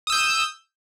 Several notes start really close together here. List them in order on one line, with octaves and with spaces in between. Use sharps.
D#6 E6 G6